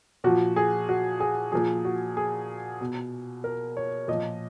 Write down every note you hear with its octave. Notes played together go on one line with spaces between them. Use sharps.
A#2 F3 F#4
G#4
F#4
G#4
A#2 F3 G#4
F#4
G#4
B2
A#4
C#5
A#2 F3 D#5